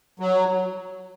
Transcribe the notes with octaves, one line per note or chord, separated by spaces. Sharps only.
F#3